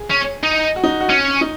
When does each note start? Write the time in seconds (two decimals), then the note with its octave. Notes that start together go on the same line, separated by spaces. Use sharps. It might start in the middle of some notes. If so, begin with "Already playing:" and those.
Already playing: G#4
0.10 C#4
0.43 D#4
0.76 F#4
0.84 D#4
1.01 F#4
1.09 C#4
1.41 D#4